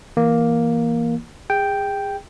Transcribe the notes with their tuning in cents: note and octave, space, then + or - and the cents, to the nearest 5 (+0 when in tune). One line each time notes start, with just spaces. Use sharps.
E3 +0 A#3 +5
G#4 -30 G5 +0